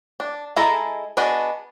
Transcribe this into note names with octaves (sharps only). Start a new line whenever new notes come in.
D4
G#3 E4 G#4 A4 A#5
B3 D4 F#4 G#4 D#5